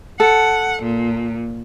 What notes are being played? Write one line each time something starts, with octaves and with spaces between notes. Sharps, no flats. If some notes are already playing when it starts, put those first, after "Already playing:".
A4 F#5
A#2